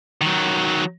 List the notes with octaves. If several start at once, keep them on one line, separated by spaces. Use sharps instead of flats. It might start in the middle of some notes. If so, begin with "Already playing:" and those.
D#3 F#3